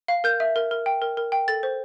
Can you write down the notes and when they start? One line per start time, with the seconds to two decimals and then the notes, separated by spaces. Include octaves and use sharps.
0.08 F5
0.24 A#4 G6
0.40 E5
0.56 A#4
0.71 A#4
0.86 G5
1.02 A#4
1.17 A#4
1.32 G5
1.48 A4 A6
1.63 C5